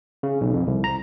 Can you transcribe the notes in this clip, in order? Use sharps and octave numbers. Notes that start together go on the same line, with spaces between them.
C#3
B1
F2
C2
A#5